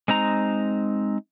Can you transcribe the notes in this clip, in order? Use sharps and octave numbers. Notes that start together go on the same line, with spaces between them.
G#3 C4 D#4 A#5